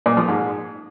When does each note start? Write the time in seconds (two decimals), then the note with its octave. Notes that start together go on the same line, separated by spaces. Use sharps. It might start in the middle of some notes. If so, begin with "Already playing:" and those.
0.06 A#2
0.17 F3
0.28 G#2